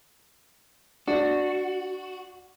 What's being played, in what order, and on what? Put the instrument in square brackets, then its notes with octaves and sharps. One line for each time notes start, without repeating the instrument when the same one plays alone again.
[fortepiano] D4 [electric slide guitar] F#4